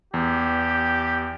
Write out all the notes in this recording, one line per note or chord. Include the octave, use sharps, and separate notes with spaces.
E2 G4